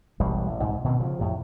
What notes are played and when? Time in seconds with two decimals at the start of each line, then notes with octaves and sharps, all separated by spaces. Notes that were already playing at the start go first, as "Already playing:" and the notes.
0.20 E1 A1 G3 G#3
0.48 A1
0.60 C2 G#2
0.84 B2 D#3 G3 C4
1.00 C#3 F3
1.19 F2 A2 C3